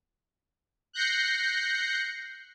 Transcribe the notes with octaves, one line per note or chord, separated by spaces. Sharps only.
F#6 G6 A#6 C7 C#7